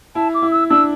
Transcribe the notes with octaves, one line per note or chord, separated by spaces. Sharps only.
E4 A5
D6
E4
E6
D4 E6